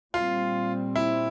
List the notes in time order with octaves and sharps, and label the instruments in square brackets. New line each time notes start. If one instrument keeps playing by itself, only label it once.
[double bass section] A#2 G3 C4 [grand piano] F4
[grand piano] E4